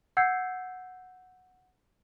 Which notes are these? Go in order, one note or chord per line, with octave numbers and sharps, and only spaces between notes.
F#5 E6 G6 G#6 C7 C#7